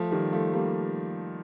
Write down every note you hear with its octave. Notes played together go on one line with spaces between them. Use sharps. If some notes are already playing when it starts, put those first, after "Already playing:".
Already playing: F3 A3
D#3 G3
F3 A3
G3 A#3